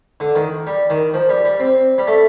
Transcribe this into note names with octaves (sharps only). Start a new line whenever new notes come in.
D3
D#3
G3
D#3
F3
G3
G3
C4
G3
A3